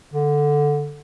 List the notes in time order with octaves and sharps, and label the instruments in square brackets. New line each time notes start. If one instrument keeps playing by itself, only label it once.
[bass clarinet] D3